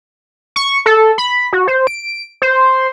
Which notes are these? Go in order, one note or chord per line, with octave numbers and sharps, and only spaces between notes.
C#6
A4
B5
F#4
C5
D7
C5